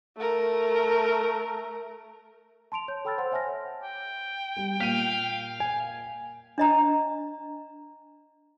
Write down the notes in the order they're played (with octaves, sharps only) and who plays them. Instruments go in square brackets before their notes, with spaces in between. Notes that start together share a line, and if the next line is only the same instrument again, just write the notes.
[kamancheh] A3 A#4
[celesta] A5 C6 D7 F7
C#5 G6
A4 G5 B5 E6 F6 A6
C5 F#5 C6
C#5 E5 G#5 A5 F6 A#6
[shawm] G5
[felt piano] G3
[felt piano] A#2 [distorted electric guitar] F5 [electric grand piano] B6 D#7
[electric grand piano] G#5
[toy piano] D4 D#5 A#5